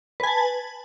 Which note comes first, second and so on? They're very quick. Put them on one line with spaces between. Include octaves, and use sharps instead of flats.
B4 G#5 A5